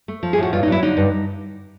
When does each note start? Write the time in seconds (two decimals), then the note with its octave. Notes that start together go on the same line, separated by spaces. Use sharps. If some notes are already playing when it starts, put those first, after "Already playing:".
0.08 A3
0.23 F3
0.33 G#4
0.38 A2 F#4
0.53 G2 F4
0.63 D#4
0.68 F#3 E4
0.82 D3 D#4
0.97 G2